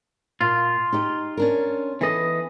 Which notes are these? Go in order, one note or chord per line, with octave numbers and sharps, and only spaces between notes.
A#2 F4
D#4 G4 D#5
C#4 D4 A#4
E3 B3 A4 B4 D#5